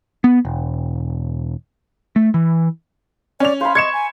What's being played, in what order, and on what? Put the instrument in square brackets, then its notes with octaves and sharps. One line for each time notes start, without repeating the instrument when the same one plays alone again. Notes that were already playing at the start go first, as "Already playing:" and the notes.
[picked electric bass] B3
E1
A3
E3
[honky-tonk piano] C#4 F7 [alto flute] D5
[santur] C5 B5 [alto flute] F5
[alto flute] D#5 [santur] C#6 [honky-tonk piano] G#6 C#7 E7
[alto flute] G#5